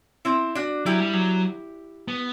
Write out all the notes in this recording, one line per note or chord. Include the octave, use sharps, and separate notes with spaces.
C4 E4
D4 F#4
F#3 E4 G4
G3
F#3
B3